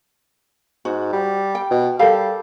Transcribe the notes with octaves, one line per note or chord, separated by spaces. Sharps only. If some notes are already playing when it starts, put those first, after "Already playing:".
G#2 F#4
G3
G5
B2
G3 A4 A#4 F5